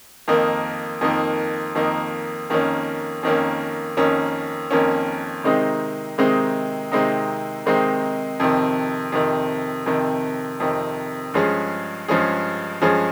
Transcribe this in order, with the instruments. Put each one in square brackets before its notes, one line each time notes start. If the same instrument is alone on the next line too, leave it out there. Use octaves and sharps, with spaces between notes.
[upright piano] F2 D#3 A#3 D#4
F2 D#3 A#3 D#4
F2 D#3 A#3 D#4
F2 D#3 A#3 C#4
F2 D#3 A#3 C#4
F2 D#3 A#3 C#4
F2 D#3 A#3 C#4
C3 D#3 G#3 C4 D#4
C3 D#3 G#3 C4 D#4
C3 D#3 G#3 C4 D#4
C3 D#3 G#3 C4 D#4
F2 C3 D#3
F2 C3 D#3
F2 C3 D#3
F2 C3 D#3
G2 F3 G#3 C#4 G#4
G2 F3 G#3 C#4 G#4
G2 F3 G#3 C#4 G#4